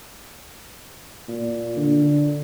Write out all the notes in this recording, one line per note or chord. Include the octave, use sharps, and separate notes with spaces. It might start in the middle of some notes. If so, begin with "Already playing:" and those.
A#2
D3